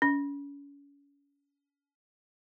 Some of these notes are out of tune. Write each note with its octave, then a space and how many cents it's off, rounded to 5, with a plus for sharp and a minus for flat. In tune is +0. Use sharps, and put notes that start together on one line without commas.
C#4 +35